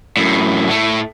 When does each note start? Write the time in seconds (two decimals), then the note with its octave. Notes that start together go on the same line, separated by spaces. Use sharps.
0.17 F#2 A2
0.68 A2 A3